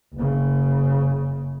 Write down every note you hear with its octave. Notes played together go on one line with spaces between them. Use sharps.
F#1 C#3